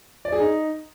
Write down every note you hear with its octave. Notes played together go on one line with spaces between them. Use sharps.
D5
G#4
D#4